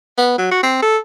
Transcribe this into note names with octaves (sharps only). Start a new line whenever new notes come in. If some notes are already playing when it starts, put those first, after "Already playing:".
B3
F#3
F#4
C4
A4